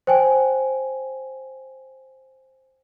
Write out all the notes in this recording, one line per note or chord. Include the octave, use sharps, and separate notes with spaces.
C5 G5 G#5